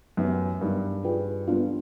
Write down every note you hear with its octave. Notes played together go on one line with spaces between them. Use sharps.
F#2 B3 D#4 G4 B4 E5
G2 B3 D#4 G4 A#4
F4 G#4 B4 D5 G5
G3 B3 D4 F4